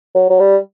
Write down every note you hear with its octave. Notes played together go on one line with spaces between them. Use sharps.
F#3
F#3
G3